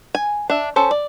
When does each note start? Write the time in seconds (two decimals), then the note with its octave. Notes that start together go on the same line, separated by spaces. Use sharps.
0.15 G#5
0.50 D4 E5
0.76 C#4 A4 C5
0.91 D5